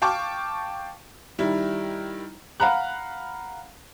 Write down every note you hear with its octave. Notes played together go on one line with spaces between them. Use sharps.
F5 G5 A5 C#6 D6
D#3 G3 E4
F5 F#5 A#5 B5 F#6